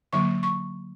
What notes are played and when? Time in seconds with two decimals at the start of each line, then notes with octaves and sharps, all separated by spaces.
0.13 D3 F#3 A#3 C#6
0.43 C#6